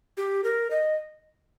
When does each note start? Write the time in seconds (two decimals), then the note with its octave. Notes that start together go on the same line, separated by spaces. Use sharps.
0.17 G4
0.44 A#4
0.71 D#5